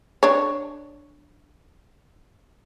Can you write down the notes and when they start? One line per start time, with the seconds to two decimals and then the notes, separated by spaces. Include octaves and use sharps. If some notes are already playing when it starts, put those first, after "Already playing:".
0.23 D4 C#5